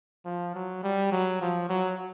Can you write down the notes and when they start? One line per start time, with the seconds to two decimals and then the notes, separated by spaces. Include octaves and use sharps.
0.25 F3
0.54 F#3
0.83 G3
1.12 F#3
1.41 F3
1.69 F#3